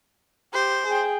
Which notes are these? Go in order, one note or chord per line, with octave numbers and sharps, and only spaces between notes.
G4 C5
G#4 G5